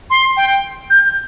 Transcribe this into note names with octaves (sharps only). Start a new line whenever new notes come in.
C6
G5
G6